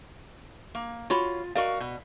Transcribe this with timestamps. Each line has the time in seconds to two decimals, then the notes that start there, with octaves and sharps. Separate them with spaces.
0.75 A#3
1.10 F4 F#4 C#5 B5
1.55 F#4 A#4 D5 D#5 F5
1.80 B2